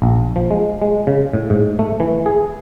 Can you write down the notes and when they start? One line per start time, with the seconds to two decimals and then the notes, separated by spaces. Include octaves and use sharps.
0.02 A#1
0.36 F3
0.51 G#3
0.82 G#3
1.07 C#3
1.33 A2
1.50 G#2
1.79 A3
2.00 E3
2.26 G#4